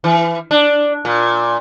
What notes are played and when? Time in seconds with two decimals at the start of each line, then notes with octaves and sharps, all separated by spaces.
0.04 E3
0.51 D4
1.05 A#2